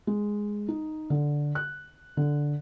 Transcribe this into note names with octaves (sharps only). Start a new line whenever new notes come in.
G#3
D#4
D3
F#6
D3